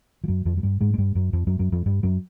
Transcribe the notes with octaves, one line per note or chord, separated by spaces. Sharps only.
F3
F#2 F#3
F2 F3
F#3
G2 G3
G#2 G#3
G#3
G2 G3
F#2 F#3
F2 F3
F#2 F#3
F#2 F#3
F2 F3
G2 G3
F#2 F#3